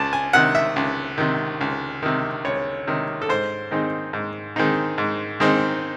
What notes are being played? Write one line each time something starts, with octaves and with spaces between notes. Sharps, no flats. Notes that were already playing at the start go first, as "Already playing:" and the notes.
Already playing: C#2 A5
G#5
C3 D#3 F#5
E5
C#2
C3 D#3
C#2
C3 D#3
C#2 C#5
C3 D#3
A4
G#2 C5
D#3 G#3 C4 D#4
G#2
D#3 G#3 C4 D#4
G#2
D#3 G#3 C4 D#4